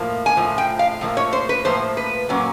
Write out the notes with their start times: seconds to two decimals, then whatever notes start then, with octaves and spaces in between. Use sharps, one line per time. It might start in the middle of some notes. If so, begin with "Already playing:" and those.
Already playing: A2 F3 A#3
0.26 G#5
0.37 A2 F3
0.58 G5
0.79 F5
1.01 A2 F3 A#3
1.17 C#5
1.33 C5
1.49 B4
1.65 A2 F3 A#3 C5
1.97 B4
2.29 A#2 F#3 A#3 C#4